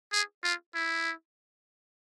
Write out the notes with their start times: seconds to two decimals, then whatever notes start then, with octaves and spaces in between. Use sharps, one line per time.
0.12 G#4
0.44 F4
0.75 E4